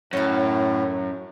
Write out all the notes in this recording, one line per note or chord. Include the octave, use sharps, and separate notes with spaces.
F#2 A2 C#5 F5